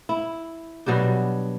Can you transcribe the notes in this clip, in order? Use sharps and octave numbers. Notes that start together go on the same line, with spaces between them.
E4
B2 F#3 G3 D4